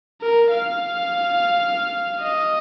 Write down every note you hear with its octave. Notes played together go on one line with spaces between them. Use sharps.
A#4
F5
D#5